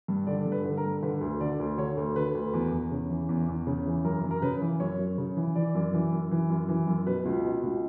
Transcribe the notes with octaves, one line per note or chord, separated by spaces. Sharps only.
G2
D3 D5
G2
B4
D3
A#4
G2
D3 B4
D2
D3 D5
D2
D3 C#5
D2
D3 B4
D2
E2
E2
C#3
E3
E2
E2
C#3
E3
F#2 A#4
F#2
A#4
C#3 B4
E3
F#2 C#5
F#2
C#3
E3
E3 D5
F#2
E3
F#2
E3
F#2
E3
F#2
B2 B4
C#2
B2
C#2